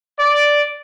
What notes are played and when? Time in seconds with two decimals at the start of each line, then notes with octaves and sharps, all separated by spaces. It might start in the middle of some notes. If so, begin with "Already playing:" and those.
0.19 D5